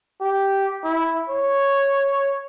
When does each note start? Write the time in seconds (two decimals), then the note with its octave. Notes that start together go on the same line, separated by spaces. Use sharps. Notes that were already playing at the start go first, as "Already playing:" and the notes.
0.21 G4
0.84 E4
1.30 C#5